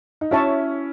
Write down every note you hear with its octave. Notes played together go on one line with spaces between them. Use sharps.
D#4
C#4 E4 F#4 C#5 E5 A5 C#6